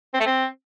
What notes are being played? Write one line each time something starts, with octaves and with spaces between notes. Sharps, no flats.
C4
A3
C4